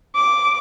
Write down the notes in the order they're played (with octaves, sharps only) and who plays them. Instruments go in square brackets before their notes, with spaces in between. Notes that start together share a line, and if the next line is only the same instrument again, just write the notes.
[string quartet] D6